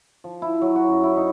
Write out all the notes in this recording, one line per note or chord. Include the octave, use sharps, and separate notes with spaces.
F3
E4
F#3
F#4
F#2
E4
D#4